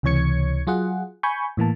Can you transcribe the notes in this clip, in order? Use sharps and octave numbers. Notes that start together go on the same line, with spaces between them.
C#2 C3 E3 C#5 G#6 C#7
F#3 F4 G#4 F#5
G#5 B5 C#6 G6
A2 E3 A#3 A5